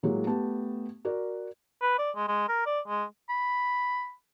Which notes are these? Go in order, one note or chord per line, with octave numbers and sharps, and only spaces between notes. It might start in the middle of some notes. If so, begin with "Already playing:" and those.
A2 F#3 G#3 A#3 G4
A3 B3 G4 A5
F#4 A#4 D5
B4
D5
G#3
G#3
A#4
D5
G#3
B5